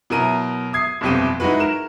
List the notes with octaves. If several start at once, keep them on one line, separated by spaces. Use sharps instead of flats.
B2 F#3 E4 A#4 A#5 D#7
D#6 G#6 C7
G1 C2 F2 B2 G4 D#7
G#3 D#4 E4 F#4 B4
A#4 E7